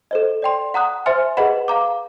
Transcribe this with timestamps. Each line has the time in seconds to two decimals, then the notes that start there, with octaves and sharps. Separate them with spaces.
0.11 A4 C5 D#5
0.42 D5 G5 C6
0.74 F#5 A#5 D#6 F#6
1.06 C5 E5 G#5 C6 F6
1.37 G#4 B4 D#5 F#5 B5
1.68 F5 A#5 D6